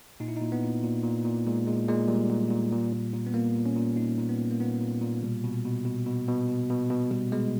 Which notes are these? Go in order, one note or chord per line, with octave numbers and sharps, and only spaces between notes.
A#2 D#4
E4
A#2 D#4
B3
A#2
A#2
A#2
A#2
A#2 G#3
A#2 G#3
A#2 G#3
A#2 G3
A#2
A#2
A#2
A#2
A#2
B3
A#2 A#3
A#2
C#4
A#2
A#2 D#4
A#2
B3
A#2
A#3
A#2 B3
A#2
A#2
B2 G3
B2
B2
B2
B2
B2
B2
B2
B2
B2 G3
B2 G#3